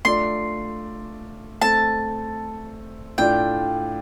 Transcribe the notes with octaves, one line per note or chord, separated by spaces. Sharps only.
A3 D4 F4 D5 C6
A3 C4 A4 A5
A2 A3 D4 F4 D5 G5